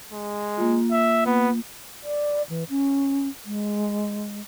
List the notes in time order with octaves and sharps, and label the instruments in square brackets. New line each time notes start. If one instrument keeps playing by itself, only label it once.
[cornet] G#3
[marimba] A#3 F4
[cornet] E5
[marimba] A#3 [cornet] B3
[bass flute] D5
E3
C#4
G#3